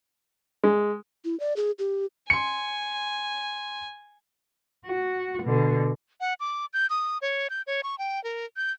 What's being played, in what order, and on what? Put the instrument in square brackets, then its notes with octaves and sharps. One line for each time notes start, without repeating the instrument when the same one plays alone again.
[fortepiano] G#3
[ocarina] E4
D5
G#4
G4
[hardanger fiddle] G#5 [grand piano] C6 C#7
[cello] F#4
B2 D3
[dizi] F#5
D6
G6
D#6
C#5
G6
C#5
C#6
G5
A#4
G6